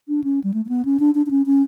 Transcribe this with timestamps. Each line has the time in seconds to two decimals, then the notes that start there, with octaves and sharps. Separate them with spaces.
0.08 D4
0.24 C#4
0.44 G3
0.54 A3
0.65 A3
0.69 B3
0.85 C#4
1.00 D4
1.15 D4
1.26 D4
1.31 C#4
1.46 C#4